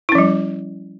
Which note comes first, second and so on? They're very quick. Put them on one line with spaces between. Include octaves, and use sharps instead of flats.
E4 C#4 F3 G3